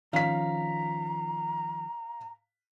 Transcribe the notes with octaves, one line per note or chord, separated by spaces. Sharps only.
D#3 F3 C#4 F5 A#5 B6